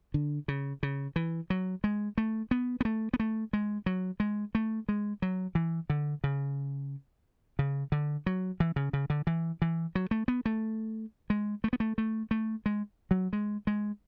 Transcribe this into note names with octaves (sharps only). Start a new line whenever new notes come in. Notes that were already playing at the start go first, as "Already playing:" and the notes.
D3
C#3
C#3
E3
F#3
G#3
A3
B3
B3
A3
B3
A3
G#3
F#3
G#3
A3
G#3
F#3
E3
D3
C#3
C#3
D3
F#3
E3
C#3
C#3
D3
E3
E3
F#3
A3
B3
A3
G#3
A3
B3
A3
A3
A3
G#3
F#3
G#3
G#3